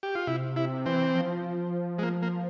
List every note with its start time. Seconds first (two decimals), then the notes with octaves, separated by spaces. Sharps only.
0.03 G4
0.15 F4
0.27 C3 E4
0.56 E4
0.86 E3 C4
1.14 F3
1.99 G#3
2.03 A#3
2.22 A#3